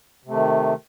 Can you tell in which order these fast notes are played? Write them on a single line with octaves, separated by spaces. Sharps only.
C3 A3 D#3